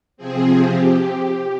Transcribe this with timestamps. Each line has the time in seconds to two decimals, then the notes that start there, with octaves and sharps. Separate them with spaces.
0.17 C3 F3 C4 G#4
0.59 G4